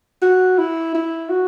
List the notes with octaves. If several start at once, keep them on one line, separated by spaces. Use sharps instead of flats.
F#4
E4
E4
F#4